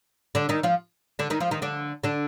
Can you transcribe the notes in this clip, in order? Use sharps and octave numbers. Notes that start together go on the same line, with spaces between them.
D3 D4
D#3 D#4
F3 F4
D3 D4
D#3 D#4
F3 F4
D#3 D#4
D3 D4
D3 D4